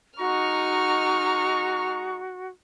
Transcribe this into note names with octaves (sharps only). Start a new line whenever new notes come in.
G#3 D#4 F#4 A#5 C#6 F6